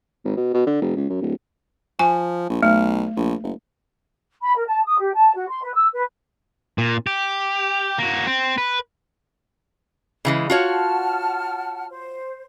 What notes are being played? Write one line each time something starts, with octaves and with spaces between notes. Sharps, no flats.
G#1
B2
B2
D3
F1
C#2
F#2
D1
F3 G#5
A#1
B1 A3
A#1
F#1
B5
A#4
A5
D#6
G4
A5
F#4
C6
B4
E6
B4
A#2
G4
A#3 F#4
C4
B4
C#3 E3 G#3
F4 F#4 C#5 F#5 A5 F6
C5